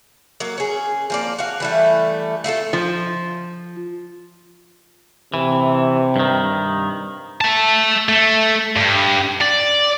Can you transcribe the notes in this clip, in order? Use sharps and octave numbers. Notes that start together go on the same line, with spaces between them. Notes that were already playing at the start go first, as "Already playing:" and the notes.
F#3 A#3
C#4 G#4
F3 A#3 D5
F#4 F5
E3 G3 A3
A3 F4 G4 A4
F3
C3 E3
G2 D#3
E5 A5
A3
G2
D5